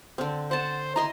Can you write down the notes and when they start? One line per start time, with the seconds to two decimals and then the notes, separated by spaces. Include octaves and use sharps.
0.18 D3 C4
0.51 C5 F#5 A5
0.96 E4 D#5 A#5 C6